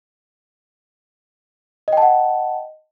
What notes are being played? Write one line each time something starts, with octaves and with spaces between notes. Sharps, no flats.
D#5 F#5 G5 A5